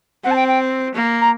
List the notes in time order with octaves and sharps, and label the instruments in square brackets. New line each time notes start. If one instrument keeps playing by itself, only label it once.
[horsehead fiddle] C4 [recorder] F#5
[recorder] A5
G5
G5
[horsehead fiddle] A#3
[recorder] A#5